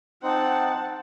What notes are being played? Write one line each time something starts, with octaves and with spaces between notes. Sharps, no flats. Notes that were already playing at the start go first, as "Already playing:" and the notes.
C4 D#4 C5 F#5 A5